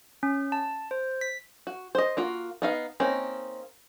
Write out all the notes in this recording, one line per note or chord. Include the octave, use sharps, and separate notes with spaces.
C#4
A5
C5
B6
F#4
C5 D#5
A#3 F4 F#4
B3 D#4 F5
A#3 C4 C#4 D#4